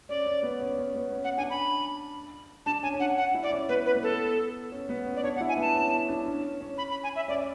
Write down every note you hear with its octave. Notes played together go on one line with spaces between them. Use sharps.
C#4 D5
C#4
B3
C#4
C#4
B3
C#4
F#5
D4 G#5
B5
D4 A5
C#4 G#5
C#4
D4 F#5
F#5
E4
D5
C#4
B3 B4
B4
B3
A4
C#4
B3
C#4
D5
D4 C#5
F#5
E4
G#5
B3 A5
C#4
C#4
D4
C#4
C#4
B5
B5
G#5
E5
C#4 D5